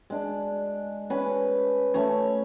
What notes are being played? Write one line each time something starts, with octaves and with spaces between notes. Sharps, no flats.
G#3 D4
C#4 B4
A3 C#4 C#5